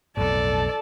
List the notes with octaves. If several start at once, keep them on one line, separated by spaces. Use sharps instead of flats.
B1 F2 A2 A4 D5 A5